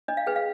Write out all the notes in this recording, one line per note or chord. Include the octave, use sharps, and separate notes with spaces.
D4 D#5
F5
G#4 B4 G5
F5